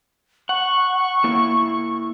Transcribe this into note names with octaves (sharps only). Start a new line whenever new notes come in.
F#5 C#6
A#3 E4